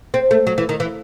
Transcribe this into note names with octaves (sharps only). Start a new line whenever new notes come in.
C4
A3
F#3
E3
D#3
E3